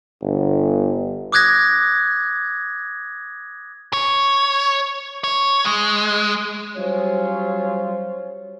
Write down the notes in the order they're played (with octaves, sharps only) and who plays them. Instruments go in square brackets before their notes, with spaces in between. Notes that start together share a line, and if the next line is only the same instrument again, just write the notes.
[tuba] G1
[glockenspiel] D6 D#6 F#6 G#6 A#6
[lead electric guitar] C#5
C#5
G#3
[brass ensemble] F#3 G3 C#4 F4 C5 C#5